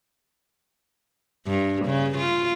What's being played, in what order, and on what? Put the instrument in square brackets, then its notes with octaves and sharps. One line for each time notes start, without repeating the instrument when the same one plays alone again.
[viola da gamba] G2
C#3
F4